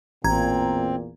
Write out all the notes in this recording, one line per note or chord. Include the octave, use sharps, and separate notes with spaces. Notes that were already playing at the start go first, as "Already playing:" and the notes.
A1 E2 A#2 C4 A#5 G#6